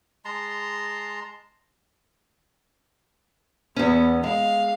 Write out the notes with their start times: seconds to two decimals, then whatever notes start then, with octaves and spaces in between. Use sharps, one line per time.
0.25 G#3 A5 A#5 C6
3.76 E2 B3 C#4
4.24 G#3 F5